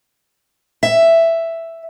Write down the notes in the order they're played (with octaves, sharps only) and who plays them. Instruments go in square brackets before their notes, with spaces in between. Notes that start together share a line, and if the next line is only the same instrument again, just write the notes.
[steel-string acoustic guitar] E5